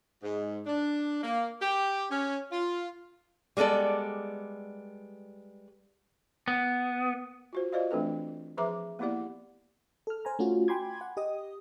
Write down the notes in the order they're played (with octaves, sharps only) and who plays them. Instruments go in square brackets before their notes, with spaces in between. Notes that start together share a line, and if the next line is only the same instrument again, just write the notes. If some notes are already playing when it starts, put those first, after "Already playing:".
[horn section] G#2
D4
A#3
G4
C#4
F4
[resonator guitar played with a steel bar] G3 G#3 B3 A4 D5
[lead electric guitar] B3
[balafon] F4 F#4 C5
F4 C5 D5 D#5 F5
E3 A3 C4 D4 A4 B4
F3 G#4 B4 E5 A#5 D6
A#3 B3 E4 G4 D5 F#5
[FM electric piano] A4 F6
C5 G#5 A#5
A3 C#4 F4 F#4
G5 G#5 B5 C6 D6 G#6
F#5
G4 D#5 D#6